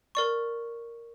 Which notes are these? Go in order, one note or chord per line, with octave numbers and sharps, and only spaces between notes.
A#4 D5 C#6